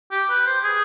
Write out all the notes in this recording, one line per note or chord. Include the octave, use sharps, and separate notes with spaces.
G4
B4
C5
G#4